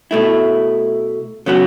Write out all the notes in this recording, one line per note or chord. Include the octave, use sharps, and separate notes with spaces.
B2 A3 E4
C#3 F#3 B3 F#4